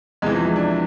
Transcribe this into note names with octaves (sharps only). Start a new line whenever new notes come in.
E2 C3 E3 G#3
F3
G#3
D4